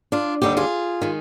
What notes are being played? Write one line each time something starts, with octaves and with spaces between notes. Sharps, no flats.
D4 F4
D#2 D3 G3 D#4 G4
F4 G#4
D#3 G#3